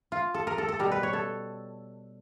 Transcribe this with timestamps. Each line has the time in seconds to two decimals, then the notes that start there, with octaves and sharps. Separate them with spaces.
0.12 F4
0.34 A4
0.47 A#4
0.58 A4
0.68 A4
0.79 B2 G3 A#4
0.91 B4
1.03 C#5
1.13 A4